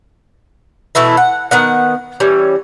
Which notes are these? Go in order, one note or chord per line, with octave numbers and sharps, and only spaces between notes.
B2 E3 A3 E4
F#5
D#3 B3 F#5
E3 G3 C#4